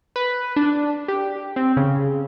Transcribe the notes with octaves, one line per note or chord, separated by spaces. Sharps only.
B4
D4
G4
C4
C#3